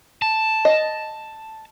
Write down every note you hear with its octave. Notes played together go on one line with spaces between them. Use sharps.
A5
D#5